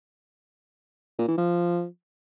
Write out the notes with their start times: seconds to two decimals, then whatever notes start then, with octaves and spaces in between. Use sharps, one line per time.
1.19 A#2
1.28 E3
1.38 F3